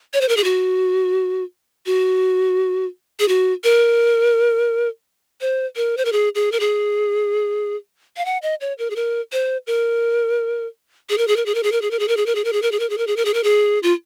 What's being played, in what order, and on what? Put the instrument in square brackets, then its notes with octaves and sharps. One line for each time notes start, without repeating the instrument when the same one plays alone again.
[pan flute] C#5
C5
A#4
G#4
F#4
F#4
G#4
F#4
A#4
C5
A#4
C5
A#4
G#4
G#4
A#4
G#4
F5
F#5
D#5
C#5
A#4
G#4
A#4
C5
A#4
G#4
A#4
G#4
A#4
G#4
A#4
G#4
A#4
G#4
A#4
G#4
A#4
G#4
A#4
G#4
A#4
G#4
A#4
G#4
A#4
G#4
A#4
G#4
A#4
G#4
A#4
G#4
F4